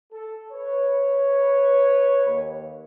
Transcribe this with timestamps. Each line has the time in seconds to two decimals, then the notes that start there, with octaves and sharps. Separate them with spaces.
0.12 A4
0.53 B4 C#5
2.26 D#2